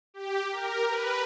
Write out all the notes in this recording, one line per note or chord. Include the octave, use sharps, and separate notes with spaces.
G4
A#4
B4